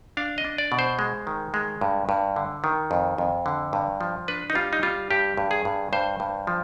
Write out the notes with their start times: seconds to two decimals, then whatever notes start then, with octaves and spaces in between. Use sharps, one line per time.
0.17 D4 F5
0.38 D#5
0.44 D4
0.58 D5
0.72 B2
0.79 C5
0.99 G#3
1.27 D#3
1.54 G#3
1.81 G2
2.09 G2
2.36 D3
2.64 D#3
2.91 F2
3.18 F2
3.46 D3
3.73 G2
4.01 F3
4.28 D4 B4
4.50 D#4
4.55 G3 F4
4.73 D#4
4.83 G3 F4
5.10 G2 G4
5.37 G2
5.51 G#4
5.65 G2
5.93 G2 C5
6.20 G2
6.47 F3